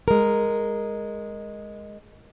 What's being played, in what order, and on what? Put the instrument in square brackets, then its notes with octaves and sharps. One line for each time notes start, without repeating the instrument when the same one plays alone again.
[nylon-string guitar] G#3 A#4